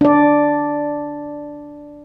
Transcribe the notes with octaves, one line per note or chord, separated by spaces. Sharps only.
D4 D5